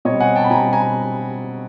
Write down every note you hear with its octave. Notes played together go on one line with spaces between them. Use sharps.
B2 G3 C4 C#5 D#5
F#5 G#5
G5 A5
B5
B2 G3 C4 G#5 A#5
G#5 A#5